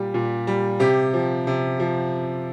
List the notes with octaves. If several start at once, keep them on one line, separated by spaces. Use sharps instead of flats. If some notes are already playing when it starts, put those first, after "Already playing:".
Already playing: A#2 G3 G4
A#2
G3
C3 G4
F3
C3
F3